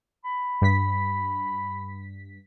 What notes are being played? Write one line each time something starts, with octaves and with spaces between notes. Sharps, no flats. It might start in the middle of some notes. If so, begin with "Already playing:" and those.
B5
G2 B6